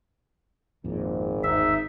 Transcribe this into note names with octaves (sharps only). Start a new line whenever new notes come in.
G#1 F2 A#2
G1 D#2 D#4 E5